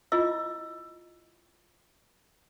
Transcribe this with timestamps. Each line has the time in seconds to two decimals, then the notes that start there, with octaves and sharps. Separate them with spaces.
0.12 E4 F4 D#5 E6